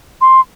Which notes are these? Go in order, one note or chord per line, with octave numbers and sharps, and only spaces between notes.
C6